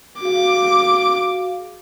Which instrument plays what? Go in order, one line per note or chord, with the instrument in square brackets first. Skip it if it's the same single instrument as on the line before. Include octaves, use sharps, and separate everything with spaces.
[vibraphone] F#4 G#4 F5 [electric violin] D6